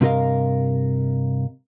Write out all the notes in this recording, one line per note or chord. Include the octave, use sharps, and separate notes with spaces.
G2 C3 F4 A#4 D#5 F5